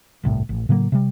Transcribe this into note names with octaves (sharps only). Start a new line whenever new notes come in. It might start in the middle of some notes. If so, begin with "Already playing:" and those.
G1 C2 A2
A1
A2 C#3 F#3 A#3
C3 G3